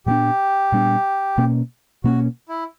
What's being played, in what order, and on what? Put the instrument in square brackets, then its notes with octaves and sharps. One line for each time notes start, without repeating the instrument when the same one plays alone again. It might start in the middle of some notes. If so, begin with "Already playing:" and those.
[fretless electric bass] A#2 G3 B3 D4 [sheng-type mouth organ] G4
[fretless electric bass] A#2 G3 B3 D4
B2 A#3 C#4
[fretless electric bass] B2 A#3 C#4 [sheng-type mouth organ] F#4
[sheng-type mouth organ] E4